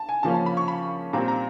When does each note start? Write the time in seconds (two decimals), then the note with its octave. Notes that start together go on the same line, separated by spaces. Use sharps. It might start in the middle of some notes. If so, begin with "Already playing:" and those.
Already playing: A5
0.09 G#5
0.23 C#3 F3 A#3 C#4 A5
0.34 A5
0.46 B5
0.57 C#6
0.68 B5
1.13 A#2 G3 C4 A#5
1.28 A#5